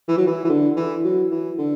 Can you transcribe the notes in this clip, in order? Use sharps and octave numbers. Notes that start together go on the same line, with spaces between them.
E3
F#3
E3
E3
D3
E3
F#3
E3
D3